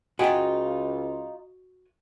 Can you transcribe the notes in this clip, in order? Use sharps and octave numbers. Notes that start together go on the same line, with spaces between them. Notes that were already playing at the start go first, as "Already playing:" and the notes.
C#2 D#4 F4 F#4 G5 G#5